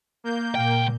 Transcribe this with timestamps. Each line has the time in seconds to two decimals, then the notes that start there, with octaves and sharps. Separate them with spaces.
0.24 A#3 G6
0.55 C#2 A#2 G5